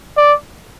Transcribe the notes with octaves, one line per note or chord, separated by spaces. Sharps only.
D5